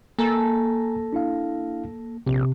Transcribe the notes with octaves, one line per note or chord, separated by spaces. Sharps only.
A#3 A4 G#5 A#5
D4 E4 F5
A#1 C3